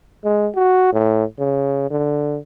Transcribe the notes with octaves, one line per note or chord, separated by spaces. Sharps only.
G#3
F#4
A2
C#3
D3